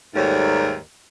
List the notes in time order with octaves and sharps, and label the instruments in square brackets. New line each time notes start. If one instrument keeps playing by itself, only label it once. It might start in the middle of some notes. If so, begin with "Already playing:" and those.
[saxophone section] D#2 G#2 G3 A3 A#4 C#5